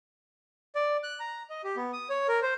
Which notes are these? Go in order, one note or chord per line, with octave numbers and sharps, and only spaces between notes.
D5
F#6
A#5
D#5
G4
B3
D#6
C#5
A#4
C5